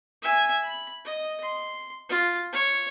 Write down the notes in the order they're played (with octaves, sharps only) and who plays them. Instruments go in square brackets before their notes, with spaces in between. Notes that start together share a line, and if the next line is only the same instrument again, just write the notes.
[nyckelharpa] E5 G#5
B5
D#5
C6
F4
C#5